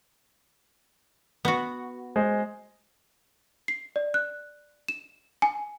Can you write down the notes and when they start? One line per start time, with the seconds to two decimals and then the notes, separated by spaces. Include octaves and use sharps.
1.45 B3 F#4
2.16 G#3 C5
3.68 C7
3.96 D5
4.14 F#6
4.88 E7
5.42 G#5